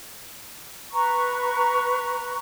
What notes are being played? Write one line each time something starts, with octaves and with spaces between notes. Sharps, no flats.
B4 A#5 C#6